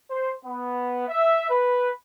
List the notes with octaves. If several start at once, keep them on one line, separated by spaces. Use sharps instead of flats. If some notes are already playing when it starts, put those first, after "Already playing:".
C5
B3
E5
B4